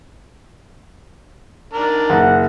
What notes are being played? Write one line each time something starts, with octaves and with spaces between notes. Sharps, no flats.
D#3 D4 A#4
F#1 F#5